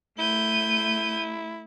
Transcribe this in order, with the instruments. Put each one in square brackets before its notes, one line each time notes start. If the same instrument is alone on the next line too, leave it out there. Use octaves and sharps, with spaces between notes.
[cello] A3 [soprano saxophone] E4 [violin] G6 D#7